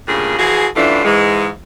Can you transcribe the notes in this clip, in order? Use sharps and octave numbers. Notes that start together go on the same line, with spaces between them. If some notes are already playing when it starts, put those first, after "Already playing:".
D2 G2 A#2 C#3 G#4
E3 F3 F#4 G#4
F#2 A2 E3 A3 D4 F4
G#2 E3 G#3